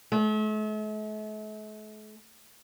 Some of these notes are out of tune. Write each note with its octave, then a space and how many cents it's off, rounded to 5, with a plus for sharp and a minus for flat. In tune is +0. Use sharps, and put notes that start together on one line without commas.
A3 -45